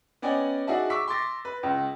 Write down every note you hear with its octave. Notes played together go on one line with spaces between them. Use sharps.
B3 C#4 D5 D#5 G5 G#5
D#4 F#4 G#4 D5 E5 A5
C#6 D6 E6 B6
C6 D6 A6 A#6
B4
C#2